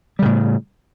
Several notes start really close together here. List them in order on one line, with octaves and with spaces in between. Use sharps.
G3 C#3 A2